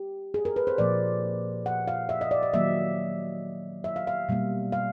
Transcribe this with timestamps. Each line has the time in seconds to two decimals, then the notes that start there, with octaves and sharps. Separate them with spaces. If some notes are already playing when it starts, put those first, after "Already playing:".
Already playing: G4
0.34 G#4
0.45 A#4
0.56 B4
0.67 C5
0.78 A#2 F3 A#3 D5
1.66 F#5
1.88 F5
2.09 E5
2.21 D#5
2.31 D5
2.43 D#5
2.53 D#3 F#3 A#3 E5
3.84 E5
3.96 F5
4.07 F5
4.29 B2 G3 A#3
4.72 F5